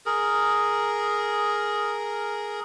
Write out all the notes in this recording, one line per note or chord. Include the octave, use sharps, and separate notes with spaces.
G#4 A#4